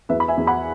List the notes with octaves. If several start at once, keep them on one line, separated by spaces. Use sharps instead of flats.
E2 B4 E5
B5
E5 G#5
E2
F#5 B5